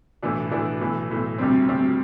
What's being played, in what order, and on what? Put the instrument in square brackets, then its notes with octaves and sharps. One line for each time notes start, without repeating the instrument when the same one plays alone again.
[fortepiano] B1 A2 E3 B3 D4
B1 A2 E3 B3 D4
B1 A2 E3
B1 A2 E3
D2 C3 G3 C4
D2 C3 G3 C4